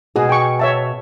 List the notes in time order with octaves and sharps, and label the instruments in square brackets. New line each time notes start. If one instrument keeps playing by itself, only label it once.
[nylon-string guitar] B2 F#4 G#5 [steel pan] G#4
[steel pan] G5 C#6
C#5 E5 A5